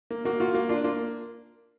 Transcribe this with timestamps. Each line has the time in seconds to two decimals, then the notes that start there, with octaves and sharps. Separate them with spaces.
0.11 A#3
0.25 A#3 F#4
0.40 F4 F#4
0.54 A#3
0.69 D4 F4
0.84 A#3 F4